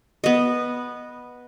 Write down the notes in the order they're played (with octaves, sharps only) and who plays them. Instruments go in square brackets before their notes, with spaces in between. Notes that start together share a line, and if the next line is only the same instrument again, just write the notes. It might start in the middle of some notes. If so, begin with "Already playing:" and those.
[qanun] B3 D#5